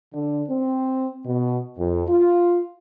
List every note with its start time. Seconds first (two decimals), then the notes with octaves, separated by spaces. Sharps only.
0.14 D3
0.49 C4
1.26 B2
1.78 F2
2.08 F4